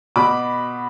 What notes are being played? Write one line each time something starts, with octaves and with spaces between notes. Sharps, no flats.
B2 B5 D6